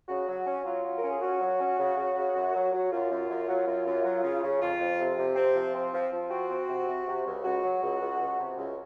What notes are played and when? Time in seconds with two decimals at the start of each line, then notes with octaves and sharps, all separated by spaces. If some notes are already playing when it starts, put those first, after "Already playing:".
0.09 C#3 F#4
0.27 F#3
0.46 C#4
0.65 F#3 F4
0.85 F#3
0.98 A#4
1.03 C#4
1.09 G#4
1.22 C#4 F#4
1.41 F#3
1.60 C#4
1.79 C#3
1.97 C#3
2.16 C#3
2.35 F#2
2.54 F#3
2.73 F#3
2.91 F#2 F4
3.11 F#2
3.29 F#2
3.48 F#3
3.67 F#2
3.86 F#2
4.04 F#3
4.23 C#3
4.43 C#3
4.61 F2 F4
4.80 F2
4.99 C3
5.17 C3
5.36 C4
5.55 F3
5.74 C4
5.94 F3
6.12 F3
6.30 C4 F#4
6.50 C4
6.68 C3
6.88 C3
7.07 C3
7.25 C#2
7.44 C#2 F#4
7.62 F#3
7.82 C#2
8.00 C#2
8.20 C#2
8.38 C3
8.57 C#2